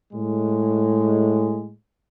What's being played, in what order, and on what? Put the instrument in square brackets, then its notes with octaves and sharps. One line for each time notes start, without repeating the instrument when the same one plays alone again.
[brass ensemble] A2 G#3